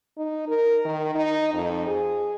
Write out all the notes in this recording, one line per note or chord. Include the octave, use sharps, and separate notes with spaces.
D#4
A#4
D#3
D#4
F2
G#4